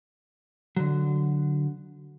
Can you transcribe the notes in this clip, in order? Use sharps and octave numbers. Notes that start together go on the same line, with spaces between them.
D3 F#3